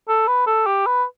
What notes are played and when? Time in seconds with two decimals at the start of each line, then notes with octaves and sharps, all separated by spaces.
0.09 A4
0.28 B4
0.47 A4
0.67 G4
0.86 B4